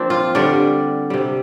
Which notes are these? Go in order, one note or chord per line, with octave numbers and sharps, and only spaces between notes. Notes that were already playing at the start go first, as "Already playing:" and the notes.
Already playing: F3 A#3 C4 D4
F4
G2 D3 G3 D4
C3 G3